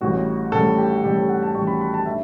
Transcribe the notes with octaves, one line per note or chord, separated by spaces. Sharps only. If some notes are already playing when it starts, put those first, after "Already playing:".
A1 A2 G3 F#4
A1 A2 G3 A4
G4
A1 A2 G3 G4
A4
F#5
A5
A1 A2 G3 C#6
B5
B5
A5
D3 E5